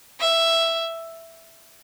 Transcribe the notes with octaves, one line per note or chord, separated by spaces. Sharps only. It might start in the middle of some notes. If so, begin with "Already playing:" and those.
E5